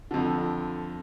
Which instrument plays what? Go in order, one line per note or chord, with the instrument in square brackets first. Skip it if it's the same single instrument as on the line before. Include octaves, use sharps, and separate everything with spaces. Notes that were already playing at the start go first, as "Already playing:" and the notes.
[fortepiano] F2 D3